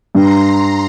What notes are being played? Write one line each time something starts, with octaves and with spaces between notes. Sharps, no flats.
G2 A#5 C6